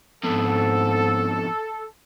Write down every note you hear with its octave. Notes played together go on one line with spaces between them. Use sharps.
F2 G#2 B2 A4